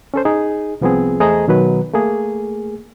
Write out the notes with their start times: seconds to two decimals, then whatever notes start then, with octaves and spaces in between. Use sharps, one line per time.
0.14 C#4 A4 C5
0.25 D#4 G#4
0.81 C2 F3 B3 C4 G#4
1.20 E2 A3 G#4 C5 D#5 A#5
1.48 B2 D#3 F#3 B4
1.93 A3 A#3 G#4